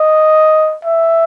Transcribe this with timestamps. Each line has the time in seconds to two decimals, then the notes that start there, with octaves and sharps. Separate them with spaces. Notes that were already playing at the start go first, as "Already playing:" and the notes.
Already playing: D#5
0.85 E5